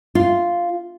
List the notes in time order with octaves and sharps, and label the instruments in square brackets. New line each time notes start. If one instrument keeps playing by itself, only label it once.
[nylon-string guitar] F4